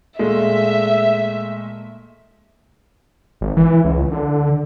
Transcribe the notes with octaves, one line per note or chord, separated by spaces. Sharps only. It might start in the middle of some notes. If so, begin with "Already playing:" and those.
A#2 G#3 A3 E5
G#1
E3
C#2
D3